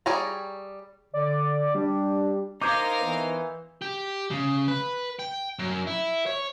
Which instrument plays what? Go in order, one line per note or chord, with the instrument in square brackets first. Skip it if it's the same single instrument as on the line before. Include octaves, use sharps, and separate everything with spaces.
[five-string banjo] G3 G#4 C#5 G5 A#5
[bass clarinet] D3 [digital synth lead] D5
[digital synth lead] G3 [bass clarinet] D4
[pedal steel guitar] D#4 C5 D#5 [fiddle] A#4 F5 [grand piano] D6 G6 G#6
[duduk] E3 [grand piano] B3
[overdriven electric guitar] G4
C#3
B4
G5
F#2
E4
C#5